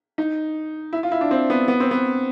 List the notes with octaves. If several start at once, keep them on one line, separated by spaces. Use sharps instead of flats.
D#4
E4
F4
E4
D4
C4
B3
B3
C4
B3